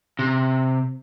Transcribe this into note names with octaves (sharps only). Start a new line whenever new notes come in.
C3